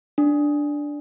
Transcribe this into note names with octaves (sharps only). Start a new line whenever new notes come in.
D4